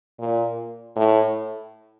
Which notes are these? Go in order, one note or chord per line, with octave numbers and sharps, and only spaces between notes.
A#2
A2